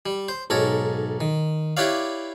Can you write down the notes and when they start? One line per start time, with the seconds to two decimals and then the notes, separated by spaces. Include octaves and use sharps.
0.06 G3
0.28 C5
0.50 B1 G#2 A4 A#4 C#5
1.21 D#3
1.77 E4 G4 B4 C#5 D5 F5